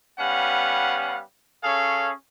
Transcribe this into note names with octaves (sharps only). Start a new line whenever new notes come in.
G3 B3 C#4 F5 F#5
C#4 G#4 A4 C#5 F5